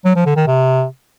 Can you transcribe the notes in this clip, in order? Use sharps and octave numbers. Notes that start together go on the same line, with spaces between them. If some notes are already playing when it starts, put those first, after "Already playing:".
F#3
F3
D3
D#3
C3